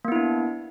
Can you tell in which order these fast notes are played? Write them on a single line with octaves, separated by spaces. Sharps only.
A#3 B3 E4 D4